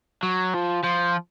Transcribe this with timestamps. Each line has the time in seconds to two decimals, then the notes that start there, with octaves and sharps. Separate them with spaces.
0.23 F#3
0.54 F3
0.83 F3